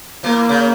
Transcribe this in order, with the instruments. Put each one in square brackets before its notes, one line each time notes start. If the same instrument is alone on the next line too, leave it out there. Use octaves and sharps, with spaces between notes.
[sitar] E3 [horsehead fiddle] A#3
[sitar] C#3